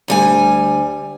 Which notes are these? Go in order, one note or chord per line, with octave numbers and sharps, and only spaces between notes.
D2 G3 G#5